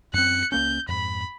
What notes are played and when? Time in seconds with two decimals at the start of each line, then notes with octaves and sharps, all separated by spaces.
0.14 F#2 C4 F#6 C#7
0.52 C#2 A#3 C#4 G6
0.88 F2 G#2 B5